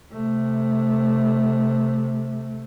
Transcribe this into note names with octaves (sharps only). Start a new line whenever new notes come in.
C3 A3